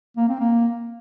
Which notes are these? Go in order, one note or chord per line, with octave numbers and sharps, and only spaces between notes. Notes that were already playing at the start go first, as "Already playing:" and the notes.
A#3
C4
A#3